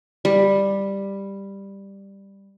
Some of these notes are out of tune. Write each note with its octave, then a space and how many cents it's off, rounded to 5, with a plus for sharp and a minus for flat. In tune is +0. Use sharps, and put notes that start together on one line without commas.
G3 +10